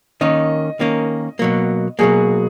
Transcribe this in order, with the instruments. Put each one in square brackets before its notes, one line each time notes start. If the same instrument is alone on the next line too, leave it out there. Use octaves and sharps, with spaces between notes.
[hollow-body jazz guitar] D#3 A#3 C#4 [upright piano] D#5
[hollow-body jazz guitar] D#3 A#3 C#4
B2 F#3 A#3
[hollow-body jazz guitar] B2 F#3 A#3 [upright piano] G#4